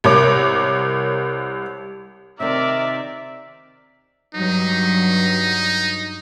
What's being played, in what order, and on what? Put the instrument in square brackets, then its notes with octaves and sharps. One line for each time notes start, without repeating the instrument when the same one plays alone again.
[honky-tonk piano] C2 A#4 C#5 D6
[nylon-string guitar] C3 D#3 [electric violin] A#4 D5 [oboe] E5
[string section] G2 F#3 [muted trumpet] D#4